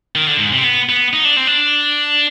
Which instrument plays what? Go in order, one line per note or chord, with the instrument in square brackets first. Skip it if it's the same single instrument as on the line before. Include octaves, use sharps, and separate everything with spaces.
[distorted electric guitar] D#3
D3
G#2
C3
C4
B3
B3
D#4
D4
C4
D4